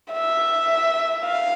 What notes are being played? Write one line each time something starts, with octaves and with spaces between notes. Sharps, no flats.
E5
F5